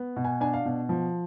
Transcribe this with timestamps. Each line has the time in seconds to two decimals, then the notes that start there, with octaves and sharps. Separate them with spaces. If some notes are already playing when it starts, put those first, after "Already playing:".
Already playing: B3
0.16 B2
0.25 G#5
0.41 D4 G#5
0.54 F5
0.65 B2
0.89 F3